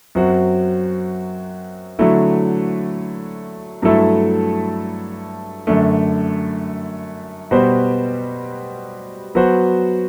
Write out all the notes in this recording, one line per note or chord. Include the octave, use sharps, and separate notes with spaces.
F#2 F#3 C4 F#4
D3 F#3 A3 E4
G2 F#3 A3 E4 A4
F#2 D3 A3
B2 G3 B3 F#4 C5
F#3 B3 F#4 C5